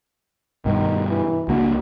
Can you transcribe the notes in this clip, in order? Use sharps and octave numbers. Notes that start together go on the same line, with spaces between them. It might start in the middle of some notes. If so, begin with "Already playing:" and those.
G2 B2 D#3
E3
C#2 A#3 D4 F#4